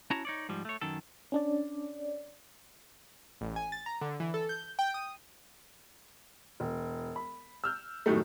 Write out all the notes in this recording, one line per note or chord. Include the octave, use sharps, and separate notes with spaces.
C#4 E4 F#4 C#5 A5 A#5
D#4 C#5 D5
G#2 F3 G3
A3 C#5
F#2 D#3 A4
C#4 D4 D5
A1
G#5
A6
A#5
D3
E3
A4
G6
G5
D#6
E1
B5
E6 F6 G6
F#2 A2 D#3 F#3 G3 A3